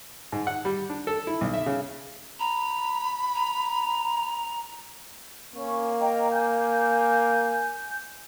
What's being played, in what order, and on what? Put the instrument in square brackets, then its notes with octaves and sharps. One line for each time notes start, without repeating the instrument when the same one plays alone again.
[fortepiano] G#2
F#5
G3
D4
A4
E4
B1
E5
C#3
[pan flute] A#5 [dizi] B5
[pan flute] A#5
[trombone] A#3 [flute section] C#4 C#6
[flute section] D#5 G5 A#5
G#5 G6